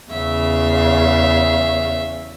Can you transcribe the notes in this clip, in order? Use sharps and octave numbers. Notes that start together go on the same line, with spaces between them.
E2 C#3 E5 F5